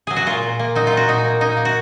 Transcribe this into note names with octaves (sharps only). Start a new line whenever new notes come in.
F#3 G#4
F#4
A#2 F4
A#2
A#3
F#3 D#4
F4
A#2 F#4
A#2 D#4
A#3
A#3 D#4
A#3
F#4